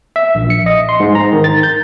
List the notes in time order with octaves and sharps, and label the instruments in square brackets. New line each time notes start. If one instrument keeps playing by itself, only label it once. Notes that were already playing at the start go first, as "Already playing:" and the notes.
[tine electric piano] E5
A#1
C#7
D#5
C6
G#2
A#5
D#3
A6
G6